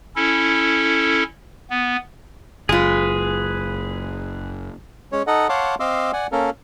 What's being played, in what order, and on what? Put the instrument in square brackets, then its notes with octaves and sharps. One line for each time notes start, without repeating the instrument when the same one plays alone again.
[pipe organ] C#4 E4 A4
B3
[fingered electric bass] F#1 [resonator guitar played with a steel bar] G#3 F4 [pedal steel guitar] G#4 B4
[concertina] G#3 C#4 C#5
D#4 A4 D#5 F#5
C#5 F5 F#5 A5 C6 D6
C4 D#5 F5 C6 D6 E6
D5 F#5 G#5
A#3 C#4 A4 A#4